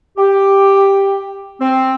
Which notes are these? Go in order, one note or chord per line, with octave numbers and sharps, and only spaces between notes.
G4
C4